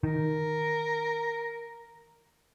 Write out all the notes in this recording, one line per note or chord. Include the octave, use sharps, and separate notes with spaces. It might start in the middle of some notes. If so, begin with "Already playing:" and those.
D#3 A#4